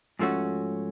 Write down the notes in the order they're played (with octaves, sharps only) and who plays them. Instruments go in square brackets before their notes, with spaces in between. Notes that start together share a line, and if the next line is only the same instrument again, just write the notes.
[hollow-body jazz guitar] G#2 F3 A3 C#4 F#4